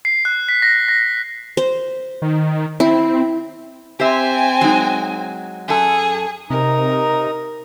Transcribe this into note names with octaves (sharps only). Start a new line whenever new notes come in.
C7
F#6
B6
A#6
A#6
C5
D#3
C4 E4
C4 G4 C5 E5 G#5
F#3 G#3 D#4
F#2 G#4 A4
C3 D#4 A#4 A#5 D#6